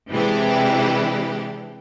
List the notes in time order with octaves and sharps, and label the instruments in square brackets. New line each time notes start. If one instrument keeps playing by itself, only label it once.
[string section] C3 E3 G#3 D4 E4 G4